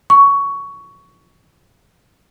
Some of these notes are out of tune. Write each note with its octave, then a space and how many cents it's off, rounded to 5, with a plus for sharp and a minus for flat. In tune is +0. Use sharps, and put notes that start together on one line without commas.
C#6 +15